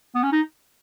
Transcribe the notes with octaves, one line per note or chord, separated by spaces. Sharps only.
B3
C#4
D#4